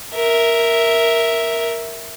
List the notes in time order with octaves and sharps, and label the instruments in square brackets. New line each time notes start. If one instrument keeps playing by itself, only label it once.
[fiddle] A#4 E5